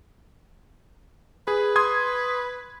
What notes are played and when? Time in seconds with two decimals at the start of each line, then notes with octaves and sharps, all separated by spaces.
1.48 G#4 B4
1.76 C6 D#6 G#6